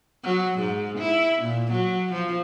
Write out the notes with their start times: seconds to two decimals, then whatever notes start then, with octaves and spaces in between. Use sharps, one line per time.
0.24 F#3
0.59 G#2
0.98 E4
1.42 A#2
1.72 F#3
2.13 F3